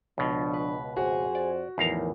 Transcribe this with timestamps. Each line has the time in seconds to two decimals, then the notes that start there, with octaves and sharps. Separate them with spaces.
0.18 C#2 B2 F3 D4
0.54 B4
0.96 F2 F#4 G#4 C5
1.35 D5
1.78 E2 A2 D#3 F3 A#4 F5 A#5